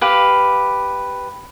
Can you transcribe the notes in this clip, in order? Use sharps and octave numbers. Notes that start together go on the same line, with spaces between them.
G4 B4 F5